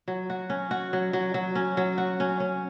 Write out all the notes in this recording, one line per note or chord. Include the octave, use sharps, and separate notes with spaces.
F#3
F#4
C#4
F#4
F#3
F#3
F#3
C#4
F#3
F#4
C#4
C#4